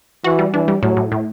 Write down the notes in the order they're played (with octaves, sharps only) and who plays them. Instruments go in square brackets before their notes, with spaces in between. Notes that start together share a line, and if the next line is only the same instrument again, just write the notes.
[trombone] E3 [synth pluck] F#4
[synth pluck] G3
[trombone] E3 [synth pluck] D4
[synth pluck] G3
[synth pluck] A2 [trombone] F#3
[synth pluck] A2
A2